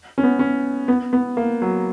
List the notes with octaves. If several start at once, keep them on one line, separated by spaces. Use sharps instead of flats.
C#4
B3
C#4
B3
B3
A#3
F#3